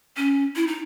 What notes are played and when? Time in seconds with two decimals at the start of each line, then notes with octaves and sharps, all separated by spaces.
0.17 C#4
0.56 E4
0.67 D#4